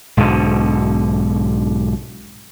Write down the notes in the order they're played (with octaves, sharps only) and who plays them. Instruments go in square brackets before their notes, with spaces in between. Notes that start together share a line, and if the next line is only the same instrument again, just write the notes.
[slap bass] B1 G#2 B2 D3